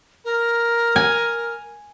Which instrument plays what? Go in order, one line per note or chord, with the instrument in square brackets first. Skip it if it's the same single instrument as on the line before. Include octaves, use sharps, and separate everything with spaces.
[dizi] A#4
[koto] G#5